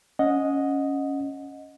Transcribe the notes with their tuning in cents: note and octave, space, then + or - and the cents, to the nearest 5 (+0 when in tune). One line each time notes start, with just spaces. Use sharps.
C#4 +0 D#5 +0 F#5 -20